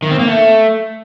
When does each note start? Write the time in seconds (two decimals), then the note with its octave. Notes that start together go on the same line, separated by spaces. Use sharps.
0.02 D#3
0.11 C4
0.19 A#3
0.28 A3